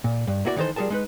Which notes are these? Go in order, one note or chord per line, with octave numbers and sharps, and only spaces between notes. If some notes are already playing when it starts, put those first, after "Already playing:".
A#2
G2
A#3 E4 F#4 A4 D5
D#3 E3 D#4 A4 C5
G3 F4 G#4 A#4 A5
G#3 D#4 B4